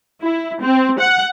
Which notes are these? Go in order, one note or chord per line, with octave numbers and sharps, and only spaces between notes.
E4
C4
F#5